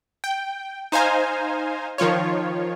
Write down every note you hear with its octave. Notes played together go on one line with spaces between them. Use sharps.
G5
D#4 C5 F5 G#5 A#5
D#3 F3 F4 C#5